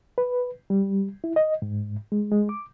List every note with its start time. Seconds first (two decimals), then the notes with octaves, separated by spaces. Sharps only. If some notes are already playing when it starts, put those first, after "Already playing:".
0.18 B4
0.70 G3
1.24 E4
1.36 D#5
1.62 G#2
2.12 G#3
2.32 G#3
2.49 D6